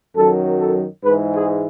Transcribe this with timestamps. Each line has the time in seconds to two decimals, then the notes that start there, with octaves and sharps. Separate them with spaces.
0.15 F#2 D#3 F#3 A4
0.59 A4
1.04 G#2 E3 G#3 B4
1.34 G#4